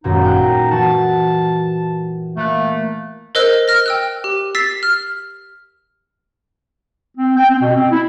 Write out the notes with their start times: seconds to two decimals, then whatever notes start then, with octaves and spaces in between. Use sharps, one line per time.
0.04 G#1 F#2 A#2 D#4
0.24 G5 F#6
0.71 E3 F#4 A5
2.37 A3 A#3 F#6
3.35 A#4 C5 D#5 E6 F#6
3.68 F6 A#6
3.86 G5 E6 F#6
4.24 G4
4.55 E6 A6 B6 C7
4.83 F6
7.18 C4
7.37 G5
7.50 C4
7.62 B2
7.75 C4
7.92 E4